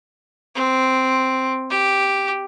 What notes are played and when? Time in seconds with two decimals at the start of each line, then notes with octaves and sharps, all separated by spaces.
0.55 C4
1.70 G4